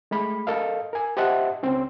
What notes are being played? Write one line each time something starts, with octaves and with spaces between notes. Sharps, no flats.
G#3 A3 B5
A4 A#4 D#5 F5
A#4 G#5
G4 C5 D#5 E5 F#5 A5
C#2 C4 C#4